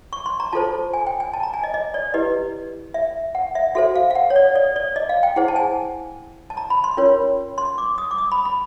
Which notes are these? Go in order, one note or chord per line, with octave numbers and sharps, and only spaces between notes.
C#6
C6
A#5
F4 A4 C5 A5
G#5
G5
G#5
A5
A#5
G#5
D#5
D#5
D5
E4 G4 B4 D#5
E5
F#5
E5
F#4 A4 C5 E5
F5
F5
F#5
C#5
D5
D5
D5
D#5
F5
G5
E4 G#4 C5 F#5
A5
G#5
A5
A#5
B5
C6
C#4 F4 A#4 C#5
C6
D6
D#6
D6
D#6
B5
B5